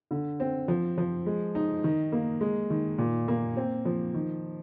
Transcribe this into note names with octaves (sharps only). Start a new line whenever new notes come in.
D3
C4
F3
F3
G#3
D#4
D#3
A#3
G#3
D#3
A#2
A#3
C4
F3
D#3